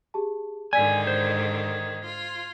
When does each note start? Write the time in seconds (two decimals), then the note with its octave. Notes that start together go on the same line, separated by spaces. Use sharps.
0.14 G4 G#4 A5
0.73 G#2 D3 D#3 D5 G#5 G#6 B6
1.07 C5
2.03 F4